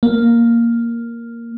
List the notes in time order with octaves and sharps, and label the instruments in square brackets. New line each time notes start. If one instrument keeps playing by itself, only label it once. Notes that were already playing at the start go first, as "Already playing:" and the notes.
[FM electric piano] A#3